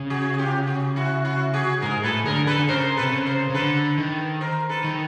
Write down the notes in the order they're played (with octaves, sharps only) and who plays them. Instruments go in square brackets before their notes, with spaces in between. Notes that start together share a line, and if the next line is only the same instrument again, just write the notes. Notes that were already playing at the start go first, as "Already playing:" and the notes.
Already playing: [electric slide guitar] C#3
[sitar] F#4 G#4
G#4
F4 G4
F#4 G#4
E4 F#4
E4 F#4
F#4 G#4
[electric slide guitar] G#2 [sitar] G#4 A#4
[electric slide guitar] A2 [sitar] A4 B4
[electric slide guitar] D3 [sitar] G#4 A#4
[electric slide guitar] D3 [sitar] A4 B4
[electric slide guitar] D3
[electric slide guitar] C#3 [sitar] A#4 C5
[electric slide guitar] C3 [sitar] A4 B4
[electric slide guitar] C#3
[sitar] A#4 C5
[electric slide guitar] C#3
[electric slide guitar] D3 [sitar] A4 B4
[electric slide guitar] D#3
[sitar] A#4 C5
A4 B4
[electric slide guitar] D#3